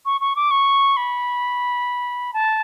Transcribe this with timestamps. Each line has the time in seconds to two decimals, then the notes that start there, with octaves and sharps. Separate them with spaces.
0.06 C#6
0.21 C#6
0.36 D6
0.51 C#6
0.97 B5
2.34 A5